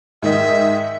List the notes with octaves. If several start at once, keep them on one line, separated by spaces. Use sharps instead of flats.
G#2 D#3 D#5 E5